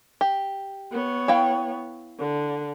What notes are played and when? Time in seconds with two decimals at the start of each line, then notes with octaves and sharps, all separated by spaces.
0.21 G4
0.92 B3 C#5
1.28 E4 F5 G5
2.19 D3